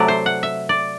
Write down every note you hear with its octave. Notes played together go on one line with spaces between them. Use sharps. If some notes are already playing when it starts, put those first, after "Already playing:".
Already playing: C3 F#3 A3 D5
C5
F#5
E5
D5